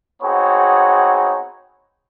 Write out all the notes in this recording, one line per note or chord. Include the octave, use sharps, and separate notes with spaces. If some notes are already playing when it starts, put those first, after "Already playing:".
B3 C4 D#4 F#4 G#4 C#5